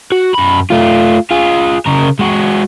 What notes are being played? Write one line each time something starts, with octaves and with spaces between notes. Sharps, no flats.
F#4
F#2 B5
A3 F4
F4 G#4
C#3 A#4
G#3 F#4